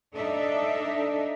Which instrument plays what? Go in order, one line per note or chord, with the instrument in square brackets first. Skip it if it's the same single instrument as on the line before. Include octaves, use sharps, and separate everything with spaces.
[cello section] D4 D#4 A4 D5 E5